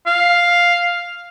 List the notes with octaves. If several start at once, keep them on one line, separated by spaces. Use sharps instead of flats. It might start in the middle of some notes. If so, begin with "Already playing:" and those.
F5